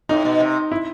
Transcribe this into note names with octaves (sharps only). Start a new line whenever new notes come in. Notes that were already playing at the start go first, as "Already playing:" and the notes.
A2 D#4
B2
C3
E4